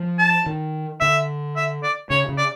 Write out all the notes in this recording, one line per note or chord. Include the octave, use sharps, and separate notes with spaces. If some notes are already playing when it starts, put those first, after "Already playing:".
Already playing: F3
A5
D#3
D3 E5
E5
D5
C#3 C#5
C#3
D5